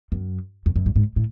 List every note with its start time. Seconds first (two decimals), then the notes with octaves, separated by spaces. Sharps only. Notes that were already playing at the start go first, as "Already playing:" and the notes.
0.12 F#2
0.66 F2
0.76 F#2
0.86 G2
0.96 G#2
1.16 A2